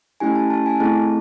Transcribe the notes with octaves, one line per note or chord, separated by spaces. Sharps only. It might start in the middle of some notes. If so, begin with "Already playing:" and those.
A3 C#4 E4 G4 G#5
A5
A5
G#5
A3 C4 E4 G#4 A5